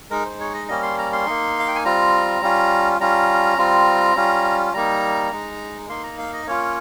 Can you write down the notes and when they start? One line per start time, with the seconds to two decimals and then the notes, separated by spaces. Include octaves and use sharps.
0.10 G#3 D#4 A#4
0.25 C5
0.40 C#5
0.54 D#5
0.68 G3 A#3 C#4 D#5
0.83 C6
0.98 A#5
1.13 C6
1.26 A#3 D#4
1.59 F5
1.68 G5
1.75 G#5
1.85 G3 C4 F4 A#5
2.42 G3 C#4 F4
3.00 G3 C#4 F4 A#5
3.58 G3 C4 F4
4.16 G3 C#4 F4
4.73 G3 A#3 D#4 A#5
5.32 G#3 D#4
5.89 A#3 D#4 C6
6.04 A#5
6.18 F5
6.33 D#5
6.47 A#3 C#4 F4 C#5